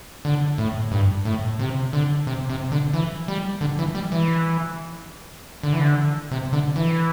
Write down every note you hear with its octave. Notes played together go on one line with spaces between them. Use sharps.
D3
A2
G2
A2
C3
D3
C3
C3
D3
E3
G3
D3
E3
G3
E3
D3
E3
D3
C3
D3
E3